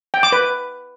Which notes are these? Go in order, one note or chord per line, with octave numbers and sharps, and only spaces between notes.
G5
D6
B4